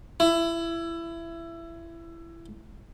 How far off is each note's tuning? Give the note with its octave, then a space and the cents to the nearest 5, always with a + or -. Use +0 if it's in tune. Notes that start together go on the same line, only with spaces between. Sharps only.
E4 +20